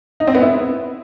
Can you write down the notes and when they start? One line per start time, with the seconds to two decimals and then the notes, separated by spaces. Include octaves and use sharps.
0.20 D#4
0.27 C4
0.35 B3
0.42 E4